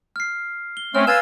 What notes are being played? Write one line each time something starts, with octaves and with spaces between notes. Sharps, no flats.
F6 C7
G7
A3 C4 C#4 F6
B4 F5 G#5 E6 G#6 A6